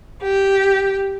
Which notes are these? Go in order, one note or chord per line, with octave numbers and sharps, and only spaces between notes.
G4